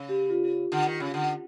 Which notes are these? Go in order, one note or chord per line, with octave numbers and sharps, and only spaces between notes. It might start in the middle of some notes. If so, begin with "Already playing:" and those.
Already playing: C#3
G4
F4
D3
D#3
C#3
D3